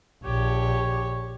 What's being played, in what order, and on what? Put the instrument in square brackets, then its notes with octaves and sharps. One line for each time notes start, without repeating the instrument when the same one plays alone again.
[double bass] A#1 [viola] G4 C#5